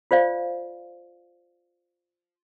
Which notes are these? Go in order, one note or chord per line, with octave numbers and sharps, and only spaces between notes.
F4 C5 D5 F5